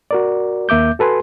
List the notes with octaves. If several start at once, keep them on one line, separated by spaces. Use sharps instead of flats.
F#4 A#4 D5
D#2 A#3 E5 D6 G6
F#4 A4 B4 G#5 C6